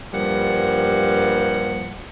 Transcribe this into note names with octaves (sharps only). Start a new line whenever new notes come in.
G2 F3 G3 A#3 F#5